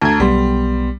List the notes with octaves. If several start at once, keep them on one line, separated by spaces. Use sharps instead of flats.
D2 A5 A#5 G#6
B1 G3 B3 C6